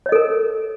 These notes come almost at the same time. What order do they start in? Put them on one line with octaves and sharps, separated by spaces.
C#5 D#5 A4 A#4